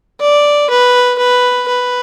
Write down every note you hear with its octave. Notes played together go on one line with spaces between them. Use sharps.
D5
B4
B4
B4